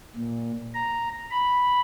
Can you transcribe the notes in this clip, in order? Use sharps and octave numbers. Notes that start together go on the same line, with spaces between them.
A#2
A#5
B5